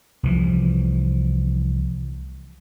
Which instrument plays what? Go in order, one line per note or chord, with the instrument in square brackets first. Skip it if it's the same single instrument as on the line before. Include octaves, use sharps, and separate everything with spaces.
[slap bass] C2 E3 F3